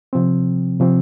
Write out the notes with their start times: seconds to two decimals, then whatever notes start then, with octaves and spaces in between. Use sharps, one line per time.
0.13 C3 F3 C4
0.80 C3 F3 C4